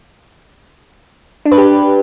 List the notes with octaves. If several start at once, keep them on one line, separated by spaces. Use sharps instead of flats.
D4
B4
G4